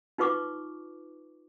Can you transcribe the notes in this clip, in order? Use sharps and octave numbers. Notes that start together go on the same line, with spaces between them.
D#4 F4 B4 C#6 D6